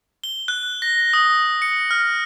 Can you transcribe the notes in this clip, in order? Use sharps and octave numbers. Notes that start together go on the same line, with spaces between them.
G7
F#6
A#6
D#6
C#7
F6